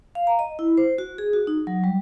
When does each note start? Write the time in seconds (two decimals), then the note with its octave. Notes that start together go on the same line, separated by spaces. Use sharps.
0.15 F5
0.27 A#5
0.39 D#5
0.59 E4
0.78 C5
0.98 F#4
1.18 G#4
1.33 F#4
1.47 D#4
1.67 F#3
1.84 G3